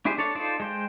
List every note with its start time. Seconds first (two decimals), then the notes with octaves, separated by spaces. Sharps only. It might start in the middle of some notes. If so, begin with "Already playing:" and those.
0.05 D4 E4 G4 G#4 C5
0.18 D4 A4 C#5 D5
0.35 D#4 F4 A4 C5 D5
0.60 G#3 C5 G5